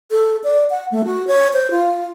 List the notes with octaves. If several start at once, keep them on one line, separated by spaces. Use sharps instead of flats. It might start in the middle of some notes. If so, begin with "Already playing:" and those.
A4
D5
F#5
A3
F#4
C#5
C5
F4